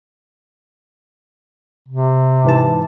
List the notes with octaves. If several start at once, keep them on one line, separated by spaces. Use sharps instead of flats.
C3
G#2 E3 A5